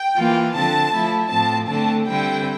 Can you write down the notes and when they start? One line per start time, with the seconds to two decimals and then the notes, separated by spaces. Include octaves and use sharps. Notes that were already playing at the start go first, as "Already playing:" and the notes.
Already playing: G5
0.16 E3 A#3 F4
0.55 D3 F3 C4 A5
0.93 F3 A3 E4
1.31 A2 F3 C4 A5
1.69 D3 A3 C4 A5
2.08 D3 G3 C4 E4 G5